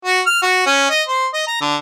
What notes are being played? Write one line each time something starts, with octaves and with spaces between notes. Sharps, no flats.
F#4
F6
F#4
C#4
D#5
C5
D#5
A#5
D3